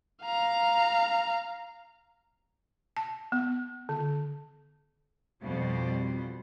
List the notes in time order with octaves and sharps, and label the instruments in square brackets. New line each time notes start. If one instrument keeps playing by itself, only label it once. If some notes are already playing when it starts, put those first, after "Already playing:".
[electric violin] F5 A#5
[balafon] A5
B3
D3
[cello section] F2 B2 G3 C5